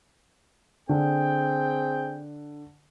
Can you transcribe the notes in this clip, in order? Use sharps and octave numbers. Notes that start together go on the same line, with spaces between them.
D3 C4 G#4 G5